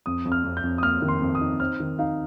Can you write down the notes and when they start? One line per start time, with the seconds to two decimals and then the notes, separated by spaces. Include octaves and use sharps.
0.06 F2 D#6
0.25 F2
0.32 F6
0.44 F2
0.57 G6
0.63 F2
0.78 D#6
0.83 A#3 F6
1.02 D#3
1.08 C6
1.22 F2
1.35 D#6
1.41 D#4
1.60 C4 F6
1.80 D#3
1.99 D#4 F5